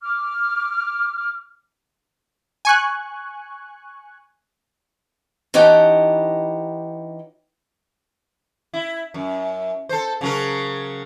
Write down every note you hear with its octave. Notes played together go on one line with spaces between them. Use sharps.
D6 F6
G#5 C#6 F#6
E3 C#4 D#4 G4 F#5 A5
E4
F#2
A4 C5
C#3 F#3 A#4